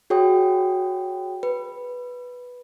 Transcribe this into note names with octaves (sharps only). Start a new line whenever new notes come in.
F#4 G#4 C#5 G5 D#6
B4